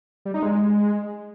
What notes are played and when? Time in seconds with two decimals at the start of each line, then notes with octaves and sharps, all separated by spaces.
0.25 G3
0.34 D#4
0.43 G#3